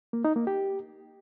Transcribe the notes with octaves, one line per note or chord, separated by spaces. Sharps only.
A#3
D#4
A#3
G4